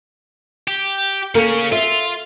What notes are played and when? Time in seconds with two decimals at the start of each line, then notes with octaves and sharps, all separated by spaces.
0.68 G4
1.35 C#3 A#3 C#4 A4 A#4
1.72 F4 E5